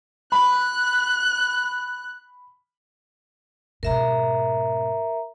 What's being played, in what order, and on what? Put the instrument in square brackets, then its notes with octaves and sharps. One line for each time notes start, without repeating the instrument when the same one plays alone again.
[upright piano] B5 [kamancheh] F#6
[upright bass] G#2 B2 [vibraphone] A#4 E5 A#5